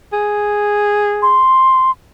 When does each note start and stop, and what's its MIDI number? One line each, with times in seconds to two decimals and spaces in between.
0.13 1.42 68
1.22 1.91 84